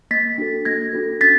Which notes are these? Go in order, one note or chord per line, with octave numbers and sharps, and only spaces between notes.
A#3 A6 B6
D4 F#4 A4
A#3 G#6 A#6
D4 F#4 A4
C#4 A6 B6